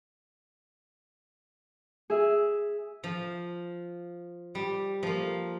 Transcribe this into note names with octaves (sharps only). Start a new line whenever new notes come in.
G#4 E5
F3
G3
F3 A#3